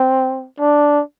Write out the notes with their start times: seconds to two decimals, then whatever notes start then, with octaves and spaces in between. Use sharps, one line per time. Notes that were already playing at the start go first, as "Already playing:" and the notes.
Already playing: C4
0.60 D4